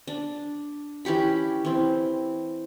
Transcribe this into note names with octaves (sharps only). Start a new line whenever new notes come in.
D4
E3 C#4 G4 B5
E3 C4